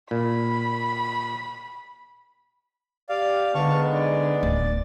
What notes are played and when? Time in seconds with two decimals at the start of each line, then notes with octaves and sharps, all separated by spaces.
0.11 A#2 B5
3.09 G4 D5 F5
3.55 G#2 D3 G#3 B3 F5 A5 C#6
3.93 D5
4.43 D1 A6